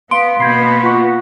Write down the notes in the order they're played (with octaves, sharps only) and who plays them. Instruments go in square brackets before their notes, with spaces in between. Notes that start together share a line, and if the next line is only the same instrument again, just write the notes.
[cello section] B3 [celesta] F5 D7 [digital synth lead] C6
[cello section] B2 A#3 B3 [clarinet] B5 [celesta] G6 G#6 C7
[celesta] F4 C#6 [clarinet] F#5